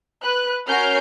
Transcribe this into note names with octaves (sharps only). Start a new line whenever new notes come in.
B4 F#6
C#4 F#4 A#4 F6 G6 C7